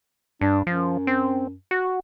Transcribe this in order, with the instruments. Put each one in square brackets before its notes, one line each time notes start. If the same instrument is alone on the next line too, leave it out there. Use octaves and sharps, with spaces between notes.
[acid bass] G2 [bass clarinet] D4
[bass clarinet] F#2 [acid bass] F3
[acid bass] C4
F#4